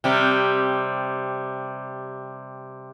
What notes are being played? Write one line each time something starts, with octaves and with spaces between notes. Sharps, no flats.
C3 G3